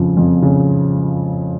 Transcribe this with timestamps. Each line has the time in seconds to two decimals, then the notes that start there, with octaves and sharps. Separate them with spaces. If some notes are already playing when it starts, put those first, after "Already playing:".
Already playing: F2 C#3 F3
0.17 F2
0.42 C#3